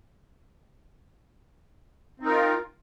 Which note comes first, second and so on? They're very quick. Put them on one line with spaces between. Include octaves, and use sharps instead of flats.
C4 D#4 A#4 F4